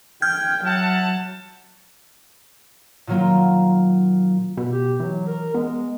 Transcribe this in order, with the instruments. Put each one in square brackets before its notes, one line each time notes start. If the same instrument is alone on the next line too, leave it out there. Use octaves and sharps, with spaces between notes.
[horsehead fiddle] G5 [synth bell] F6 G6 G#6
[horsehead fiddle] F#3 [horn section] E5 F#5 A5
[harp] A#2 D#3 F#3 A#3 F4
[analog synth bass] B2
[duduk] G4
[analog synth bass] E3 [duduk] F#3
[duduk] A#4
[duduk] G#3 [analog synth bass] B3